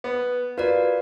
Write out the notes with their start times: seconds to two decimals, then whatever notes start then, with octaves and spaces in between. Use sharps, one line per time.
0.04 B3
0.58 F4 F#4 A#4 B4 D5